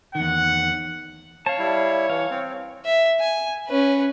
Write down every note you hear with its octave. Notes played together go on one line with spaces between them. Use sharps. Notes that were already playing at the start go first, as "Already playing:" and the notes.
E2 D#3 F#5
C#5 F5 A5
G3 E4
E3 F5
C4
E5
G#5
C#4 B4